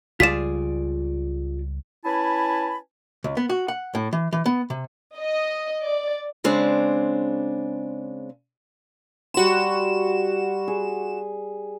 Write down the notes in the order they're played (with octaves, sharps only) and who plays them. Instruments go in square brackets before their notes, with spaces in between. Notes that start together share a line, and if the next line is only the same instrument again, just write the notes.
[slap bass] C#2 G3 [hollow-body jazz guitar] F4 G#4 D5 [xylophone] B6 E7
[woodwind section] C#4 E4 B4 G#5 A5 B5
[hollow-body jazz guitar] C#2
B3
F#4
F#5
A2
E3
E3
B3
C3
[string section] D#5
D5
[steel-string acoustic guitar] C#3 G#3 C4 D4
[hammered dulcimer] G3 C6 [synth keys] F#4 E7
[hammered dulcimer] G#4